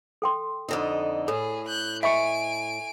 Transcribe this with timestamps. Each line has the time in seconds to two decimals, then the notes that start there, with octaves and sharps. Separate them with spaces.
0.22 A4 G5 C6
0.69 F2 D3 D#4
1.28 A2 G#4 A4
1.67 F#6 G6
2.03 D#5 E5 G#5 B5 C#6 C#7 D7